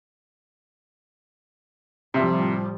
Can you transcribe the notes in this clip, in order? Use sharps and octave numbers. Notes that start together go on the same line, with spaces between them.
A2 C3 F3 G3 E5